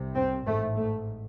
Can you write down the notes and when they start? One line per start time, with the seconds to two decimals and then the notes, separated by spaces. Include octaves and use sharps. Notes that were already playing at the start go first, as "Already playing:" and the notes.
Already playing: C2 C3
0.15 C4
0.46 A1 G#2 A3
0.76 A3